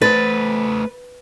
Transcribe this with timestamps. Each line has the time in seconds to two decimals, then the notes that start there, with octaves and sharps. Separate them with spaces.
0.02 A3 B4 C5 A6